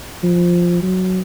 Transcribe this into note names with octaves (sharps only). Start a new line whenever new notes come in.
F3
F#3